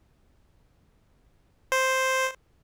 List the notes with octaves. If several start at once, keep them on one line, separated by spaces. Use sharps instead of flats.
C5